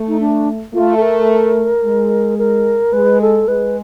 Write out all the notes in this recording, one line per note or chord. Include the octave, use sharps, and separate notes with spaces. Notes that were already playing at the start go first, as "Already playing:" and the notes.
Already playing: A3
D#4
D4
A3 F4
A4
A#4
G#3
A#4
G#3 B4
A4
G#3 B4